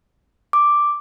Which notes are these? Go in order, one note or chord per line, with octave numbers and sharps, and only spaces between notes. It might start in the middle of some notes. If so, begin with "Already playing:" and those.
D6